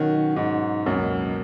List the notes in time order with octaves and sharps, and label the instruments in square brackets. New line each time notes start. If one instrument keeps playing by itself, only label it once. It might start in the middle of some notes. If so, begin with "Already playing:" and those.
Already playing: [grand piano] B2 F#3 C#4 F#4 [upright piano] D#3
[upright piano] G#2
[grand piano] C#2 B2 A#3 [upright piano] F#2